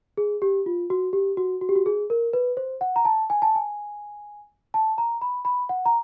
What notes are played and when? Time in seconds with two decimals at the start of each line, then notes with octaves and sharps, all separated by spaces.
0.18 G#4
0.42 G4
0.66 F4
0.90 F#4
1.13 G4
1.37 F#4
1.61 F#4
1.69 G4
1.76 F#4
1.86 G#4
2.10 A#4
2.33 B4
2.57 C5
2.81 F#5
2.96 A#5
3.05 A5
3.30 G#5
3.42 A5
3.55 G#5
4.74 A5
4.98 A#5
5.21 B5
5.45 B5
5.69 F#5
5.86 A#5